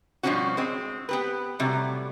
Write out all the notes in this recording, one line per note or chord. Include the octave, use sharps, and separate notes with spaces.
G2 B2 F3 C4 C#4 F#4
G#3 C4
B3 G4 B4
A2 C3 F#3 G3